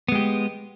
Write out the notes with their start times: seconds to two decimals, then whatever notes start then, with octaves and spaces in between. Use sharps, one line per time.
0.08 B3
0.12 G#3
0.15 G4